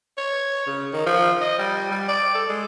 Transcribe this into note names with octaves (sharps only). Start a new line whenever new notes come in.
C#5
C#3
D#3
F3
D#5
G3
G3
D5
A4
G#3